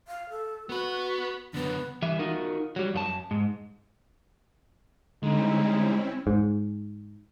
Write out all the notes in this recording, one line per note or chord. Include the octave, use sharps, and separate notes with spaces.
F5
A4
B3 F#4 B4
F#2 D3 B3
E3 G3 E5
D#4 F4 F#4 A#4
F#3 G3
F#2 F4 A5
G#2
D3 G3 G#3 C4 C#4 D#4 E4
G#2